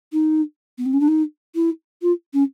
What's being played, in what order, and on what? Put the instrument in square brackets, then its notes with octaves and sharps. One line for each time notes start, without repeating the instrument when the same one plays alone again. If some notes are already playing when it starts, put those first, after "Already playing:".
[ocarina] D#4
B3
C4
C#4
D4
D#4
E4
F4
C#4